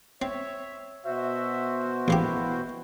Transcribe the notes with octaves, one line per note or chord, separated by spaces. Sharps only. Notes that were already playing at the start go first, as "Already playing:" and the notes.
C4 C#5 E5
B2 F#4 C5 E5
A1 A#3 E4 G4